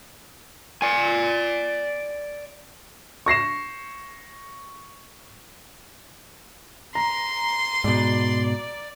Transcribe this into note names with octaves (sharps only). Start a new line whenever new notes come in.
D5 G#5
C#6 A#6 C7 E7
A#5 C6
G#2 B2 D5